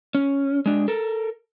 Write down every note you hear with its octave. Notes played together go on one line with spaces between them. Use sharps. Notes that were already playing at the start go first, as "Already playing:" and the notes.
C#4
G#3 D4
A4 A#4